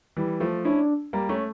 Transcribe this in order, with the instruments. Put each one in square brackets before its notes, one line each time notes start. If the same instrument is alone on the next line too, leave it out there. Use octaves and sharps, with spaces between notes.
[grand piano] E3 G3
F3 A3
[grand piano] C#4 E4 [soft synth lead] D4
[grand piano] G3 A#3
A3 C#4